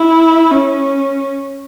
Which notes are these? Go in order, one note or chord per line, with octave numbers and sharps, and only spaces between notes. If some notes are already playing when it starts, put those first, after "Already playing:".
Already playing: E4
C#4